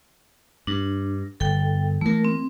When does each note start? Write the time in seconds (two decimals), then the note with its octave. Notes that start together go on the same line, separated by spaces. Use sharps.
0.67 G2 D4
1.40 G1 A4 G5
2.01 E3 A3 A#3 A#4
2.25 C4